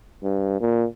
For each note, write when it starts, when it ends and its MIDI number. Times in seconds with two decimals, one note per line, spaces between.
0.23 0.56 43
0.60 0.86 46